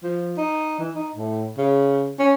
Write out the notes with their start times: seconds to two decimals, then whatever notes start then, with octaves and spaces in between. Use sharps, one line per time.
0.03 F3
0.37 D#4
0.79 E3
0.95 D#4
1.16 A2
1.58 C#3
2.19 C#4